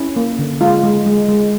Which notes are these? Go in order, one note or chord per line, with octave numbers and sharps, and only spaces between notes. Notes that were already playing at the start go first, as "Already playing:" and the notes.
Already playing: C#4 E4
A#3
D3
G#3 F4
G#3
G#3
G#3